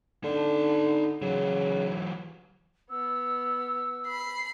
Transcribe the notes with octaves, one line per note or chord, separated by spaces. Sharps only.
D3 D#4 A5
C#3 E3 F#3
B3 E6
B5 C7